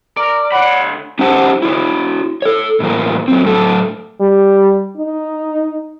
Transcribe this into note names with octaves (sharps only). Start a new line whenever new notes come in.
A#4 D5
D2 C#5 F#5 B5
C#4 D#4 G4 C5 F#5 A5
E4 F#4 C#5
A4 C#5
A2 E3 A#3 A#4
F#3 C4
A2 F#3 A3 A4
G3
D#4